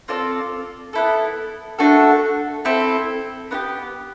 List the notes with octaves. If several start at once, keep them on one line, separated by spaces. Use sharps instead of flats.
C4 F4 A4 D5
B3 E4 A4
A3 D4 F#4 A4
C4 E4 A4
B3 D#4 G4